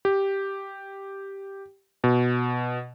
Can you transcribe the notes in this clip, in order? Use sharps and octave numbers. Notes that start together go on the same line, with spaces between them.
G4
B2